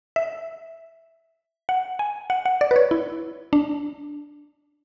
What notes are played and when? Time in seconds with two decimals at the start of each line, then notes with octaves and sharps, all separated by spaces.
0.16 E5
1.69 F#5
1.99 G#5
2.30 F#5
2.46 F#5
2.61 D5
2.71 B4
2.76 C#5
2.91 E4
3.53 D4